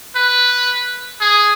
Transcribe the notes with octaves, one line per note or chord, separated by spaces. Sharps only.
B4
G#4